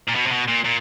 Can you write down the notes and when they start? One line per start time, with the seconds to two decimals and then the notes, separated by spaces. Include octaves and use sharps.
0.09 A#2
0.16 B2
0.27 C3
0.32 B2
0.48 A#2
0.65 A#2